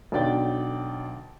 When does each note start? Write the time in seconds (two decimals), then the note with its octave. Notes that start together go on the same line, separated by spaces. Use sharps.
0.12 B1 D3 F#3 D5 G5 A6